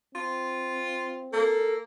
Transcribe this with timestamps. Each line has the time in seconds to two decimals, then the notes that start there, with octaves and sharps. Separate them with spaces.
0.15 C4 F4
1.33 A#3 A4